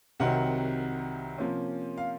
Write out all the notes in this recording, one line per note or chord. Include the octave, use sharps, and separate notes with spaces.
C2 C3 D#3 F#3 C4 F#5
C3 F3 A#3 C#4
F5